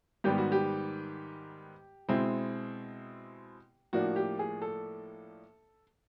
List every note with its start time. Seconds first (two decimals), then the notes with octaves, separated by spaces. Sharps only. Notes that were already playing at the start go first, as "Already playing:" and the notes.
0.24 G#2 D#3 G3 B3 G4
0.38 F#4
0.52 G4
2.09 B2 G#3 C4 E4
3.93 A2 F3 A#3 D4 F#4
4.16 G4
4.39 G#4
4.62 A4